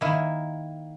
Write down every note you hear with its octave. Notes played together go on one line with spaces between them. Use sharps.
D#3 A#3 E4